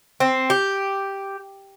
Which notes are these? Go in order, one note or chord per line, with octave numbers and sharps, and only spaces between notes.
C4
G4